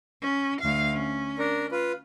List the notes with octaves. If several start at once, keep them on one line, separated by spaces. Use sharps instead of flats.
C#4
D2 F5
C#4
D4 A#4
F4 B4